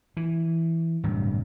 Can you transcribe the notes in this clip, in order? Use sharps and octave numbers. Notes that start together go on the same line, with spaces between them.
E3
D1 G2 C3